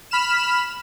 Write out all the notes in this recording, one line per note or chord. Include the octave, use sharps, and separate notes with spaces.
B5 F6 E7